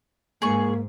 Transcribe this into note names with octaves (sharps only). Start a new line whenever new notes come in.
G#2 A#3 G#4 C#6